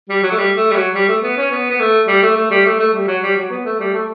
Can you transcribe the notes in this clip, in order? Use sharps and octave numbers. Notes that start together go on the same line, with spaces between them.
G3
F#3
A3
G3
A3
G3
F#3
G3
A3
B3
C#4
B3
B3
A3
G3
A3
A3
G3
A3
A3
G3
F#3
G3
F#3
B3
A3
G3
A3